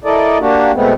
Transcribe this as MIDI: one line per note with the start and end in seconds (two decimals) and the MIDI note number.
0.04 0.38 64
0.04 0.38 69
0.04 0.38 70
0.04 0.38 74
0.04 0.38 75
0.40 0.72 58
0.40 0.72 62
0.40 0.72 66
0.40 0.72 67
0.74 0.93 47
0.74 0.93 56
0.74 0.93 57
0.74 0.93 59
0.74 0.93 60